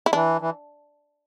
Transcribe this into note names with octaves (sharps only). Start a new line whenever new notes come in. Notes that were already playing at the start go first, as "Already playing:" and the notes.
E4
E3 D4
E3